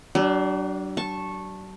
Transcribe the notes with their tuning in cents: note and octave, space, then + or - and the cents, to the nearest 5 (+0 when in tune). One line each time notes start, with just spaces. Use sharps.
F#3 +45 D4 +0
A5 +0 C#6 -15